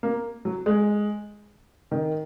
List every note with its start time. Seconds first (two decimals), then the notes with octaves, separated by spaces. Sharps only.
0.03 A#3
0.45 F#3
0.66 G#3
1.91 D#3